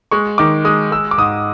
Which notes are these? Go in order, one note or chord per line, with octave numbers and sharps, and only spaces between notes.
G#3 C#6
D#3 D6
G#3 D#6
G#3 E6
D6
G#2 D#6